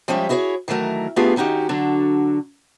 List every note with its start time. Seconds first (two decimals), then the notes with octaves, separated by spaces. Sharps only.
0.08 F3 G3 G#3 C#4 G4 E5
0.29 E4 F#4 G#4 C5 C#5
0.68 D#3 E3 F#3 A3 A#4
1.16 A3 B3 D4 F4 G4 G#4
1.36 D#3 C#4 D#4 F#4 G4
1.69 D3 F#3 D4 F#4 A4